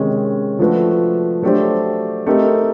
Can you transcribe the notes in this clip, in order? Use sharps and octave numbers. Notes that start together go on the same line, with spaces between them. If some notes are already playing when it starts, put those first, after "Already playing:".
Already playing: C3 D#3 G#3 C#4
F3 A3 D4 F#4 B4
F#3 A3 D4 G4 C5
A3 C4 D#4 G4 A#4